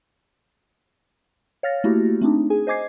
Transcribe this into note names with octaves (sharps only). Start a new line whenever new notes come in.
C#5 F5 F6 A6 A#6
A3 A#3 E4 F#4 G4
A3 C4 D4 D#4
G#4 G#5
C5 D#5 G#5 D6 G#6 C7